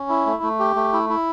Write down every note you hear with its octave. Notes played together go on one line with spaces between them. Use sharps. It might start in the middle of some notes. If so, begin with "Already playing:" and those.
Already playing: C#4
E4
A3
A3
G4
A3
E4
E4